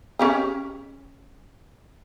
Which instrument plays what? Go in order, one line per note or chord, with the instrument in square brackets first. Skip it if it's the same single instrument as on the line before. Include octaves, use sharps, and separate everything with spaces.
[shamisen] C#4 G4 G#4